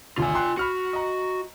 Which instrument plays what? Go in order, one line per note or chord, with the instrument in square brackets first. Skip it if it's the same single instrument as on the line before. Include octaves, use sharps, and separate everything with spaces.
[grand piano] G#1 D2 [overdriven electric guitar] F4 G#5
[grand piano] G5 C6 F#6
[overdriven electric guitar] F#4 [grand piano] B5 F6 C#7
[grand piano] D#5 A#5